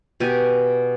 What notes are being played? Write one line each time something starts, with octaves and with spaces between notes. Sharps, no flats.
B2 G4 G#5